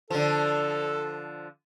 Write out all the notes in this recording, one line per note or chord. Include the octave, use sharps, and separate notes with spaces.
D3 F3 A4